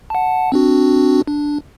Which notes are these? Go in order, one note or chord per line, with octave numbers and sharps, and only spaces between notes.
F#5 A5
C4 D4 F#4
D4